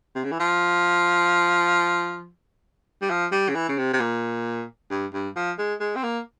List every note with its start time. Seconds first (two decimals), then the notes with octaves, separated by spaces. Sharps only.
0.15 C3
0.24 C#3
0.32 E3
0.40 F3
3.02 G3
3.10 F3
3.32 G3
3.49 C#3
3.55 E3
3.69 C#3
3.78 C3
3.93 C3
4.00 A#2
4.90 G2
5.13 G2
5.36 F3
5.58 G#3
5.80 G#3
5.95 C4
6.03 A#3